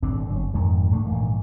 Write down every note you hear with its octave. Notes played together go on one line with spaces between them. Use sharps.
D#1 G#1 C4 D4
G1 F#3
E1 F2 G#2 D#3
A2 A3 B3 D4
A#1 G#2 E3 A#3